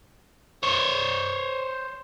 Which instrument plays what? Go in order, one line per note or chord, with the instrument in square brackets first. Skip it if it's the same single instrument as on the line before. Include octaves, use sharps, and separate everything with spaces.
[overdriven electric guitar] C5 C#5